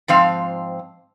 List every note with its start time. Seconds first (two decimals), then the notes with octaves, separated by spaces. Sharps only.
0.08 G#2 F3 C4 F5